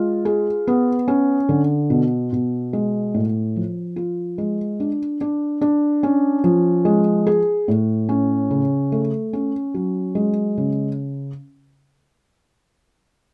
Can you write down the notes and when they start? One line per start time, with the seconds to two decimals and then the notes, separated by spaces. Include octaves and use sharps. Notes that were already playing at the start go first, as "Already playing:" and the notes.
Already playing: G#3 F4
0.25 G#4
0.68 B3
1.08 C#4
1.49 D3
1.90 B2
2.33 B2
2.73 G#3
3.14 A2
3.56 F3
3.96 F4
4.38 G#3
4.80 D4
5.21 D4
5.61 D4
6.03 C#4
6.44 F3
6.85 G#3
7.27 G#4
7.68 A2
8.09 C#4
8.51 C#3
8.92 A3
9.33 C#4
9.74 F#3
10.15 G#3
10.58 C#3